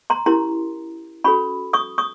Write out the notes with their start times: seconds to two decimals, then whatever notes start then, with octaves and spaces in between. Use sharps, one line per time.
0.10 A#5 C6
0.26 C#4 E4 G4 A#4 A#5 C6
1.24 C#4 F#4 A4 B5 C#6
1.73 C#6 D#6
1.98 C#6 D#6